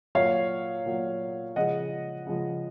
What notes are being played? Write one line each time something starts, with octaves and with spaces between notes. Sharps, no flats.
A#2 F#3 C#5 F5
A#2 F#3
C#3 F3 G#3 D#5 F#5
C#3 F3 G#3